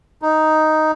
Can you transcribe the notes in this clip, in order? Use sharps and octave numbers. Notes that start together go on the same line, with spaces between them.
D#4